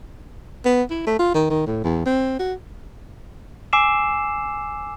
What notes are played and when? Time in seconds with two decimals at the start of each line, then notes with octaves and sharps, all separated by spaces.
0.65 B3
0.90 E4
1.07 A3
1.19 F4
1.35 D#3
1.50 D#3
1.66 A2
1.84 E2
2.06 C4
2.39 F#4
3.73 G#5 D6 E6 C7 E7